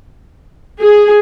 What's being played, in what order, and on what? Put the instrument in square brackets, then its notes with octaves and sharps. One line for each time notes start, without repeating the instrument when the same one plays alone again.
[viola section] G#4